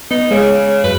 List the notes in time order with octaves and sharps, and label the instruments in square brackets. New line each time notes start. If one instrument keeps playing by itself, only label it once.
[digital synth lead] B3 [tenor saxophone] D#4
[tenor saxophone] C#3 [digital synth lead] G#3
[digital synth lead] F#2 [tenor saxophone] B4